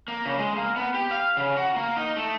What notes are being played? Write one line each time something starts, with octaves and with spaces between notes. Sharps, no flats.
A#3
C#3
G#3
A#3
B3
G4
F5
C#3
F#4
A#3
D#4
A3